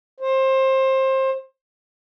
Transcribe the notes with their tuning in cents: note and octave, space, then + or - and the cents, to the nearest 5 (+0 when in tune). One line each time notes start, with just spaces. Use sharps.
C5 +25